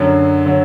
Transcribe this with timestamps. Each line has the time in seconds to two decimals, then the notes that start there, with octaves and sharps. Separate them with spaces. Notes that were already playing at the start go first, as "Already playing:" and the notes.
Already playing: F#2 D3 F#3
0.46 D3 F#3